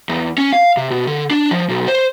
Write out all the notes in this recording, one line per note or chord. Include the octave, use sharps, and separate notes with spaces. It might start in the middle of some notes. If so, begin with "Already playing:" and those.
E2
C#4
F5
C3
B2
D3
D4
F3
B1
C5